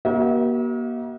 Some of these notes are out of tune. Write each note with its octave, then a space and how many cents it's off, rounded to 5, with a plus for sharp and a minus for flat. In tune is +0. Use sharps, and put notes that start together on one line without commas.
A#3 +40 F#4 +45 E5 -40